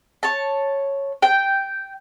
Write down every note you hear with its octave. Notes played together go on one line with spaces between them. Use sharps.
C#5 A5
G5